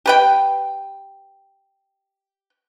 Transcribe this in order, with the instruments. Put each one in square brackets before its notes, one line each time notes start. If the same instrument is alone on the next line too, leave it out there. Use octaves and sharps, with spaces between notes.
[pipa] G4 B4 G5